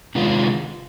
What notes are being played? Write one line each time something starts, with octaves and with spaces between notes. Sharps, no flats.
C3 D#3 G#3 F4